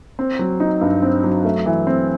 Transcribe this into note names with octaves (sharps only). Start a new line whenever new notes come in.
C4
F#3
D#4
G2
C4
F#3
A3
E3
C4